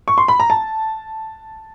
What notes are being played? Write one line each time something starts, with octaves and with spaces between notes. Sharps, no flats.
C#6
C6
B5
A#5
A5